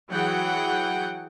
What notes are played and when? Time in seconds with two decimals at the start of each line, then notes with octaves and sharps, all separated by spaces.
0.10 E3 F#3 G#4 F#5 G5